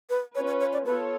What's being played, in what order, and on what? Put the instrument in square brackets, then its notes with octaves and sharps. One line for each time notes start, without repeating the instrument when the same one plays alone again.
[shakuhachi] B4
[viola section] C#4 F4 B4 [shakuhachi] C#5
[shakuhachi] C#5
C#5
D5
[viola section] B3 F4 A4 C#5 [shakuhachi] B4